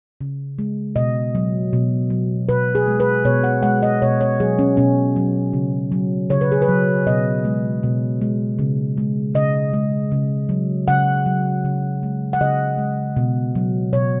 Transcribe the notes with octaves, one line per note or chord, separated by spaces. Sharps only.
C#3
G#3
B2 D#5
F#3
B2
F#3
B2 B4
G#4
G#3
B4
B2 C#5
F#5
G#3 F#5
D#5
B2 C#5
C#5
F#3 G#4
C#4
B2 C#4
F#3
C#3
F#3
C#3 C#5
B4
G#4
B4
F#3
B2 D#5
G#3
B2
G#3
C#3
G#3
C#3 D#5
G#3
C#3
F#3
C#3 F#5
F#3
C#3
G#3
F#5
C#3 D#5
G#3
B2
F#3
B2 C#5